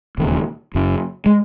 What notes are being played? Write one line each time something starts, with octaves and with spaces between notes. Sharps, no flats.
E1 D#2 C#3
F#1 F#2 C#3
G#3